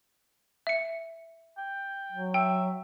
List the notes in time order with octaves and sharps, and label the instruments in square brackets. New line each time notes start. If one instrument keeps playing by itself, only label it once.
[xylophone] E5 C#7
[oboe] G5
[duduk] F#3
[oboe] E5 [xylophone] G5